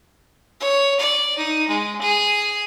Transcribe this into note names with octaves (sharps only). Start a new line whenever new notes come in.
C#5
D5
D#4
G#3
G#4